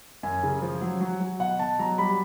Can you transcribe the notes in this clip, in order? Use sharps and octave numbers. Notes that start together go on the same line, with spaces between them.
F#2 G#5
C#3
F3
F#3
F#3
F#3
B2 F#5
B2 A5
F#3 A#5
G3 B5